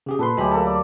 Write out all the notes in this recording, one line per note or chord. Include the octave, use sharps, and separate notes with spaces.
C#3 G4 G#4
A#2 A4 B4 C6
D2 F#3 G#3 A3 G4 B5
A#3 A4
D5